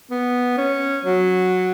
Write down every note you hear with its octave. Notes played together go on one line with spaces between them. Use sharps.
B3
C#4
F#3